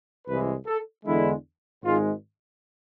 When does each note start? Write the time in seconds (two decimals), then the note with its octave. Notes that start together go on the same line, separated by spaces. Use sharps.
0.27 C2 C3 E3 G#3 B4
0.67 A4
1.06 E2 D3 G#3 E4
1.84 G#1 G#2 G#3 F4